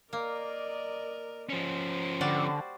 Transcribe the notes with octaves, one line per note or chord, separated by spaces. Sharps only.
A#3 A#4 D5 D#5
F3 C#4 C5
D3 G3 F#4 D5